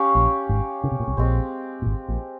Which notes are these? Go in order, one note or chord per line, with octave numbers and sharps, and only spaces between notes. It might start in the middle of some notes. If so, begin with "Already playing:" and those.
Already playing: C#4 G4 C#5 F5
A#1 A#2
G#1 G#2
C#3
C3
A#2
C2 C3
A#1 A#2 G#3 C4 G4 C5
A#2
G#1 G#2
A#1 A#2